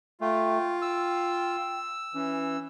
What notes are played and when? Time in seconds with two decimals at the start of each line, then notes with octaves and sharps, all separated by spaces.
0.21 A3 F4 G5
0.82 G5 E6
2.14 E3 C#4